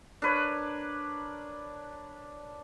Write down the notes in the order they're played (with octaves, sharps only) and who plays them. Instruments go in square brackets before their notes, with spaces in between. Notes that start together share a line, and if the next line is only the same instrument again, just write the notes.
[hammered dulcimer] D4 A#4 B4 C#5